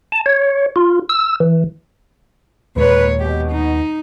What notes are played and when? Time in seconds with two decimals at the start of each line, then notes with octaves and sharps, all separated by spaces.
0.12 A5
0.26 C#5
0.76 F4
1.09 E6
1.40 E3
2.76 D#2 A#2 G#3 A#3 B4 C#5
3.19 B2 G4
3.51 D#4